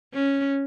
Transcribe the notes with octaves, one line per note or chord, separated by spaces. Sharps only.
C#4